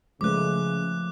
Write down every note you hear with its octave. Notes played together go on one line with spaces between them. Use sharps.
C#3 F3 G#3 A3 B4 D6 F#6